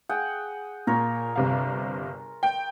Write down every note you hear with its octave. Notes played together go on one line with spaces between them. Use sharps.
G#4 F#5 G5
A#2 F4 A#4 C#5
G1 C3 F5
G5